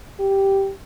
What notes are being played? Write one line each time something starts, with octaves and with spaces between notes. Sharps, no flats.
G4